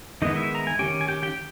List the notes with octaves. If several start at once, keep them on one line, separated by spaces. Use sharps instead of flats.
D#3 G#3 B3 D#4 E4 D#5
E4 E5
A#5
G#5
D#3 A#3 C#4 G4 G5
G#5
G4 G5
G4 G5